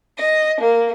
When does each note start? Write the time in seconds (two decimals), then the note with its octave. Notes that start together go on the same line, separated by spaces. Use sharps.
0.18 D#5
0.59 A#3